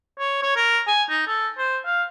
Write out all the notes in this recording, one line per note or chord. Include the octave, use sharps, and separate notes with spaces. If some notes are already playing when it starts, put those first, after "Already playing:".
C#5
C#5
A#4
G#5
D#4
A4
C5
F5